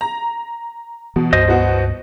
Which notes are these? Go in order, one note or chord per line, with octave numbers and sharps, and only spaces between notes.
A#5
B2 E3 B3
C#2 G2 C5 D#5
B2 B3 F#4